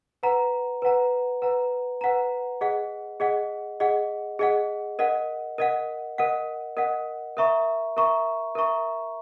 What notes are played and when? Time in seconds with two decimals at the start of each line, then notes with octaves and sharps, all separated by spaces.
0.23 B4 F#5 A#5
0.82 B4 F#5 A#5
1.42 B4 F#5 A#5
2.01 B4 F#5 A#5
2.61 G#4 D#5 F#5
3.20 G#4 D#5 F#5
3.80 G#4 D#5 F#5
4.39 G#4 D#5 F#5
4.99 A#4 D#5 F#5
5.58 A#4 D#5 F#5
6.18 A#4 D#5 F#5
6.77 A#4 D#5 F#5
7.37 A#4 E5 A#5 C#6
7.97 A#4 E5 A#5 C#6
8.55 A#4 E5 A#5 C#6